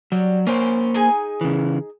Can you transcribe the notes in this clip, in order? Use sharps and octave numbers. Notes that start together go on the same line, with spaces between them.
F#3 G3
A#3 C#4 C5
D#4 G#4 G#5
C#3 E3